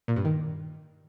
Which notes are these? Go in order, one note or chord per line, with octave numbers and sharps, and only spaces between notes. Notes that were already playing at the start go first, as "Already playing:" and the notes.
A#2
G2
D#3